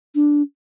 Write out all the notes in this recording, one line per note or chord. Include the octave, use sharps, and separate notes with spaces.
D4